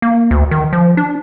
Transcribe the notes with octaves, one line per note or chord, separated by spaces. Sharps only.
A#3
D2
D#3
F3
D4